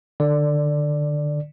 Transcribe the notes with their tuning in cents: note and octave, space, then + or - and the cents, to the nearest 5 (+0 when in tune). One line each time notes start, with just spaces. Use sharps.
D3 +20 D5 +0